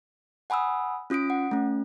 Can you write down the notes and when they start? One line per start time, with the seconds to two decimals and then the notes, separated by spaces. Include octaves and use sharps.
0.50 F#5 G#5 B5 D#6 E6
1.10 C#4 F4 D#6 B6 D7
1.30 F#5
1.51 A3 C#4